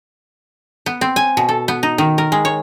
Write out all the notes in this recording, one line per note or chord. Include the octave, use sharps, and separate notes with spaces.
B3
C4
G#5
B2
A4
B3
D#4
D#3
A#4
G#3
C#5